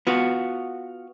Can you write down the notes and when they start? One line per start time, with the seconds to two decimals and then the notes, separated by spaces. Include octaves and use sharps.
0.07 B3 F4 F#4